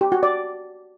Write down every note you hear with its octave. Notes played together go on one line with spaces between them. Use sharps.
G4
F#4
D5